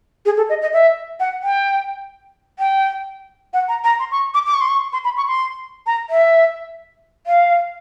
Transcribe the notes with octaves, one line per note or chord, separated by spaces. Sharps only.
G#4
A4
D#5
D#5
E5
F#5
G5
G5
F#5
A#5
A#5
C6
C#6
D6
D6
C#6
C6
C#6
C6
B5
C#6
C6
A#5
E5
F5